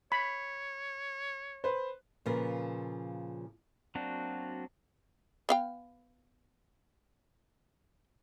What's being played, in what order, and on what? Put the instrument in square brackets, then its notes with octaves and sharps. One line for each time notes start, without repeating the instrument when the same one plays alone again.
[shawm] C#5 [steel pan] B5
[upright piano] B4 C5
[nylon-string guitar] A#2 C#3 F3 F4 A#4 B4
[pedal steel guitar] F#3 A#3 C4 D4 F#4
[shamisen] B3 F5 G5